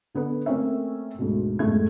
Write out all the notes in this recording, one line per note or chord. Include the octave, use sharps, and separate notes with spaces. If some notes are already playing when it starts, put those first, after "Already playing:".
D3 B3 A4 B4
A3 A#3 C4 C#4 C#5 E5
D2 G#2 B2
F#1 A2 G#3 A3 G#6